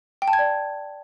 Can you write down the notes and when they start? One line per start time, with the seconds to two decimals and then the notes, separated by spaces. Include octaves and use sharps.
0.22 G5
0.28 A5
0.33 G#6
0.39 D5